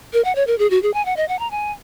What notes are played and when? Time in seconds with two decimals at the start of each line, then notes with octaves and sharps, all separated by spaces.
0.13 A#4
0.25 F#5
0.36 C#5
0.47 A#4
0.59 G#4
0.70 F#4
0.83 G#4
0.94 G#5
1.05 F#5
1.17 D#5
1.28 F#5
1.39 A#5
1.51 G#5